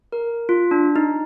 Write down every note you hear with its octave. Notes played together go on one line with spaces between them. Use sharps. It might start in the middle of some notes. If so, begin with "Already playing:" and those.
A#4
F4
D4
D#4